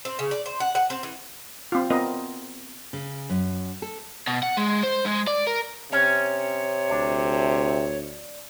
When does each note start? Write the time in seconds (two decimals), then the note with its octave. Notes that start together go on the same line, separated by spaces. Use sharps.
0.05 C4
0.19 C#3
0.31 D5
0.46 C5
0.60 F#5
0.75 F#5
0.90 C4
1.03 E3
1.72 C4 F4
1.90 B3 C4 F4 A#4 D#5
2.93 C#3
3.30 F#2
3.82 A4
4.27 B2
4.43 F#5
4.57 G#3
4.84 C5
5.06 G#3
5.28 D5
5.47 A#4
5.92 C3 C#4 C#5
6.90 D2 D4